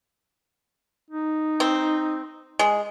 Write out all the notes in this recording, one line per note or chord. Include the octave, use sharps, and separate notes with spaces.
D#4
C4
G#3